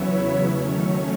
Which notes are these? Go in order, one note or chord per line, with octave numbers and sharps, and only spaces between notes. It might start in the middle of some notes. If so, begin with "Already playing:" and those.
Already playing: E2 C#3 F#3 B3 C#4 E4 C#5 E5
D#3 F#3 A3 C#4